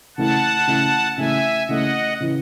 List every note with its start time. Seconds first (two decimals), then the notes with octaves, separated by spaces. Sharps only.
0.17 C#3 E3 A3 E4 F#5 A5
0.67 C#3 E3 A3 E4
1.17 C#3 E3 A3 E4 E5 G#5
1.68 C#3 E3 A3 E4 D#5 F#5
2.20 C#3 E3